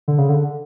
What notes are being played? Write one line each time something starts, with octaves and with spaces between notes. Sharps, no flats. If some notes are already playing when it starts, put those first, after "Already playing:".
D3
C#3
D3